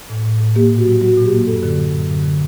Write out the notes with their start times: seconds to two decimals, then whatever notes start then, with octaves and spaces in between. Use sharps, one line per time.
0.10 A2
0.25 A2
0.41 A2
0.56 A#3 G4
0.71 A#2
0.78 F#4
0.86 F#3
1.01 F#3 F#4
1.17 A#2
1.25 G4
1.33 A#3
1.47 F#2 A4
1.63 D3
1.78 F#3
1.94 F#2
2.09 D3
2.24 D3